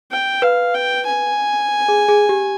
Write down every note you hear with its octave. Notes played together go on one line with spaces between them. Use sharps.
G5
B4 F5
G5
G#5
G#4
G#4
G4